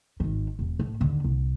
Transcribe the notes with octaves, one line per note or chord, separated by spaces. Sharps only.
G#1 D#3
E1
A2
D#2 D3
C2